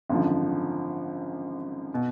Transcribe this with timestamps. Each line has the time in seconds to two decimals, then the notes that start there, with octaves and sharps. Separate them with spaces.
0.10 G#1 F#2 D3 F3
1.94 B2